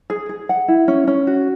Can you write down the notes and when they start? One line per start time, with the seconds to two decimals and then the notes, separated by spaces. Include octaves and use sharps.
0.10 G#4
0.29 G#4
0.49 F#5
0.68 E4
0.88 C#4
1.07 C#4
1.27 F#4